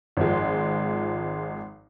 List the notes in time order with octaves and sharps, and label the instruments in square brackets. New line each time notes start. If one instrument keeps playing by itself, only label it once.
[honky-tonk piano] G#1 F3 G#3